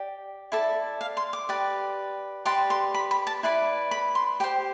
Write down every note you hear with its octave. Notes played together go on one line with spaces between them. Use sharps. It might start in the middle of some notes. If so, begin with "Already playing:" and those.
Already playing: G4 D5
E4 A4 D5
F5
C6
D6
G4 B4 D5
G4 B4 D5 C6
C6
B5
B5
A5
E4 B4 D5 B5
B5
C6
G4 C5 G5